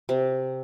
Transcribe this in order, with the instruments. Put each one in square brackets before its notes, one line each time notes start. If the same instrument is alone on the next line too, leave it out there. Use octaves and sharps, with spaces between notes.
[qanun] C3